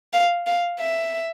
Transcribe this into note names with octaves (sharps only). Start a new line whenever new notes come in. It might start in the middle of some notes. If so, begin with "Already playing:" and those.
F5
F5
E5